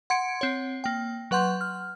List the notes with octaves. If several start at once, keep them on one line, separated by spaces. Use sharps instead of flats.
F#5 C6 G#6 C#7 D7
C4 C#5
A#3 G5
F#3 B4 F#5 C6 G6
F6